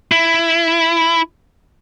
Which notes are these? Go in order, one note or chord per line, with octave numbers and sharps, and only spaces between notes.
E4